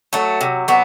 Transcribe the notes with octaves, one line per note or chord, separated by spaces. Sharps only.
F#3 A3
C3
F#3 B3